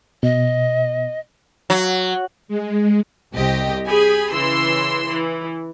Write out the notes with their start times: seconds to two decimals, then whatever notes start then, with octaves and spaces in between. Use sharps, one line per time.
0.23 B2 D#5
1.70 F#3
2.48 G#3
3.35 C2 C3 G4 D#5
3.87 G4 G#4 G#5 B5
4.33 C#3 E3 C6 E6
5.08 E3